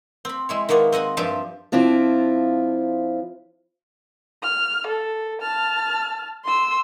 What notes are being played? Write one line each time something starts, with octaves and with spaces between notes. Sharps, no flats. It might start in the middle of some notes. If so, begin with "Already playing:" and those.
C4 B5
G#3 E4 C#5
D#3 G#3 A#3 B3 C#5
C4 D#5 F#5 G#5
G2 F3 G4 E5 G#5 A5
F3 C4 D4 E4 F4
F6
A4
A5 F6
C6 E6